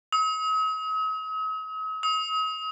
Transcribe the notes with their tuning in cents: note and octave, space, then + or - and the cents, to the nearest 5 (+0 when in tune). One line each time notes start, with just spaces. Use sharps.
D#6 +45
D#6 +40